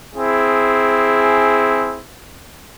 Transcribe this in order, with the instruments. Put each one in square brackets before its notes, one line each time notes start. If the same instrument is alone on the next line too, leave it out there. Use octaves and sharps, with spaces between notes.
[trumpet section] C4 E4 G#4